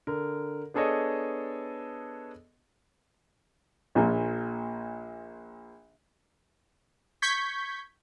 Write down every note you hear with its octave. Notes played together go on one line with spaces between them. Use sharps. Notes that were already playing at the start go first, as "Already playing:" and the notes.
D3 A#4
B3 D4 G#4 A4 C#5 D#5
A#1 A#2
C#6 G6 G#6 B6